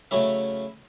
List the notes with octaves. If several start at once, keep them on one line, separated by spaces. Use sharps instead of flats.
C#3 F#3 A3 C#4 E4 E5